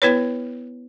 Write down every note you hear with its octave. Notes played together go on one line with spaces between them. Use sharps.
B3 E4 B4 C#5